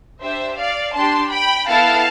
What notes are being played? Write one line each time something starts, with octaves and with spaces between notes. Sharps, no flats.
D4 G4 C5 E5
D5 F5
D4 G4 A5 C6
G5 B5
B3 E4 A4 F5 A5